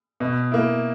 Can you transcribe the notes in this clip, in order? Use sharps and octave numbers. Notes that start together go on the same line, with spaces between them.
B2
A#3 E4